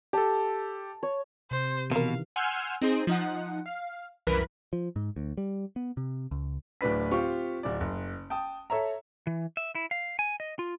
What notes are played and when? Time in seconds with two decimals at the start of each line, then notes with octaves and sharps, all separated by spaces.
0.13 G4 A4 A5
1.03 C#5
1.51 C3 C5
1.91 B2 D#3 E3 C4 A#4 F5
2.36 F#5 G#5 C6 E6 F6 G6
2.82 C4 D#4 G#4 C5
3.07 F3 D#4 F#5
3.66 F5
4.27 C2 F#2 E3 A#4 B4 B5
4.73 F3
4.96 G#2
5.16 D2
5.37 G3
5.76 B3
5.97 C3
6.31 C#2
6.81 D1 A2 D4 B4 B6
7.11 C4 F4 G4 C#6
7.63 D1 D5
7.80 F#1
8.30 G5 A5 D#6
8.70 A4 C#5 E5 A#5
9.27 E3
9.57 E5
9.75 E4
9.91 F5
10.19 G#5
10.40 D#5
10.59 F4